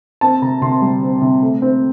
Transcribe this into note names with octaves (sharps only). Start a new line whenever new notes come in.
C4 A5
C3 A#5
C3 C6
G3
C4
C3
A3
C4